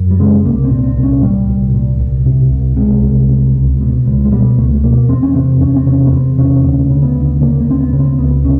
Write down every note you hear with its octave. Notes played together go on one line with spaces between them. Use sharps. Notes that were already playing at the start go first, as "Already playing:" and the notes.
Already playing: F#2
G3
C#3 G#3
C2 A#3
C4
A#2
C4
C2
C#4
A#2 G3
C2
A#2
C2
C3
C2
C3 G#3
C2
C3
C#2
B2
C#2
G#3
B2 G3
C#2 A3
A3
B2 A#3
E2 C4
C#4
C3 C4
E2 C#4
C4
C3 C#4
B3
E2 C4
C3 C#4
D2 C#4
C#3
B3
D2
C#3 A#3
A#3
D2 C4
B3
C#3
C4
C#2 B3
C3 C#4